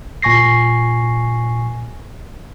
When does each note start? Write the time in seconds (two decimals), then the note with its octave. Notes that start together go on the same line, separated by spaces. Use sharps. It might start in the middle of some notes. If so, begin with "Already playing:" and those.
0.22 A#2 G#5 C#6 A#6 C7